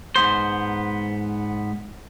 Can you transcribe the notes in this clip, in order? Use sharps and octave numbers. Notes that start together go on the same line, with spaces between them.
G#2 B2 B3 C5